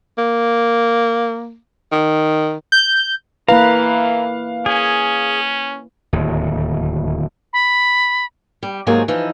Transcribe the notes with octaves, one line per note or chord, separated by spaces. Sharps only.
A#3
D#3
G6
E3 A#3 E4 B4 F5 A#5
C#4 G#4
D1 D#2
B5
G3
G#2 C3 F#3 A#3 G#4 C#5
E3 F3 D#4